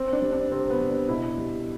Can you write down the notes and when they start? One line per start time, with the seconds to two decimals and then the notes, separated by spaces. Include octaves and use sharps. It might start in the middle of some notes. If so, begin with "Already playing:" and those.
Already playing: C4
0.13 D4
0.22 G3
0.32 D4
0.51 C3 C4
0.70 B3
0.80 G3
0.89 D4
1.09 B2 E4
1.38 G3